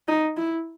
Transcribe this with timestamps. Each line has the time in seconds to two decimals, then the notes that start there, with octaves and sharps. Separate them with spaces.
0.08 D#4
0.37 E4